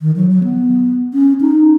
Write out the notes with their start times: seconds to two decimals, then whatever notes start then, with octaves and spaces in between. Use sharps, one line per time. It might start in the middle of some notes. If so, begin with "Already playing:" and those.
0.01 D#3
0.16 F#3
0.30 F#3
0.44 B3
1.14 C#4
1.41 D#4